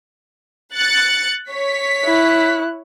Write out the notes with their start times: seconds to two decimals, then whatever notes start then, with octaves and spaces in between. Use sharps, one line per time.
0.76 F#6 A6 C#7
1.51 C#5 B6
2.05 E4 F#6